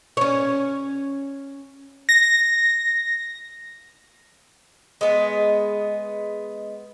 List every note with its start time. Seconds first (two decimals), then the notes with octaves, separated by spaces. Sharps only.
0.17 C#4 C#5
2.09 A#6
5.01 G#3 B3